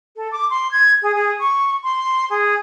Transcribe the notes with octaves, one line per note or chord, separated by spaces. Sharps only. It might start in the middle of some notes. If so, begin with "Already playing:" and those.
A4
D6
C6
G#6
G#4
G#4
C#6
C6
G#4